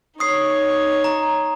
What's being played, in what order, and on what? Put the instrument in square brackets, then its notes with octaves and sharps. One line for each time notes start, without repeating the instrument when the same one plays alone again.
[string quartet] D#4 C#5 [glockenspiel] D#6 C7
[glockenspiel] A#5